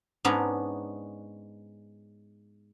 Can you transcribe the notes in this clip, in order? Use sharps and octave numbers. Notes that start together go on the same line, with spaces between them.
G#2 G#3 B3 C#4 D4 A#5